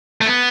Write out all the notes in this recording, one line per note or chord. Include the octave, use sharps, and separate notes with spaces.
A3
B3